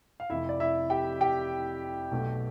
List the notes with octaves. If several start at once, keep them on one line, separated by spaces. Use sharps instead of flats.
F5
F1 F2 C3 E4 E5
D5
E4 E5
G4 G5
G4 G5
B1 B2 A3